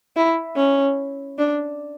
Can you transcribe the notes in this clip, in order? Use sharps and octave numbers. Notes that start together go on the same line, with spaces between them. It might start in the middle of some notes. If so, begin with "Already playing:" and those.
E4
C#4
D4